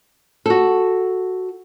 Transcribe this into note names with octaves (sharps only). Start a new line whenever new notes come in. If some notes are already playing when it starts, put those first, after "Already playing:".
F#4 A4